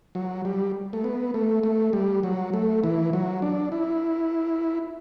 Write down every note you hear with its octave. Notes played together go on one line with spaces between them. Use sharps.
F#3
G3
A3
B3
A3
A3
G3
F#3
A3
E3
F#3
D4
E4